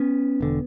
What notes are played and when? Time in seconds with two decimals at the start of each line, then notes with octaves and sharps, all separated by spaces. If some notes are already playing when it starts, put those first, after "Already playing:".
Already playing: B3 C#4
0.41 E1 D3